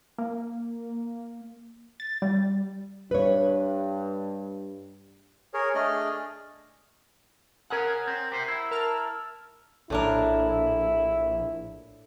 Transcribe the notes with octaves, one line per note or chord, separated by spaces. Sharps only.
A#3
A6
G3
G2 B4 C#5
G#4 A#4 C#5
A3 D4 G#4 D5 D#5 F6
C#4 G#4 A#4 F#5
C4
G4 C5
E4
A#4 A5 F6
A#1 A2 D4 E4 A#4